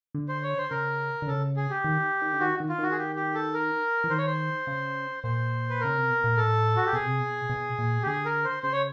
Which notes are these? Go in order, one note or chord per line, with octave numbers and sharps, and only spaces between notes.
D3
C5
C#5
C5
C#3 A#4
D3
C#3 A4
G#4
G4
D#3
D#3
D3
D#3 F#4
D#3
F4
D#3 F#4
G#4
G4
G4
A4
A#4
E3
D#3 C5
C#5
C5
C#3
A#2 C5
B4
C#3 A#4
C3
B2
A#2
A2 A4
F#4
G4
B2 G#4
C3
B2
B2
A#2
G4
D3 G#4
A#4
C5
C#3 C5
C#5